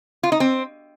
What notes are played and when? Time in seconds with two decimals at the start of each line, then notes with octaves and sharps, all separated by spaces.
0.23 F4
0.32 D#4
0.40 C4